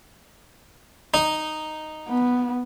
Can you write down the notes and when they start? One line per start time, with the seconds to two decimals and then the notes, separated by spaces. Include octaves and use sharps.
1.14 D#4
2.08 B3